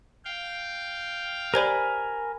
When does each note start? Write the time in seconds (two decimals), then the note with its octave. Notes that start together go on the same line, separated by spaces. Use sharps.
0.25 F5 G5
1.54 G4 A#4 C5 D5 G#5 B5